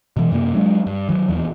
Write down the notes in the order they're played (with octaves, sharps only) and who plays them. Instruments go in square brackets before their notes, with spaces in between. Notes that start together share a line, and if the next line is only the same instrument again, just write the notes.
[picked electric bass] B2 E3
F#2 C3 A#3
F#3 G#3 D4
G2
D#3 F#3
D#1 E2